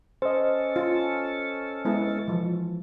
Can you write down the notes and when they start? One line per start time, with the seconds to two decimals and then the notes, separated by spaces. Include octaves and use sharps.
0.22 C#4 A4 C5 D#5
0.76 F4
1.85 G#3 B3 E4
2.28 E3 F3